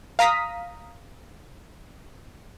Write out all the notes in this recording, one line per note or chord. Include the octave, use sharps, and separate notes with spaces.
F5 A#5 D#6 B6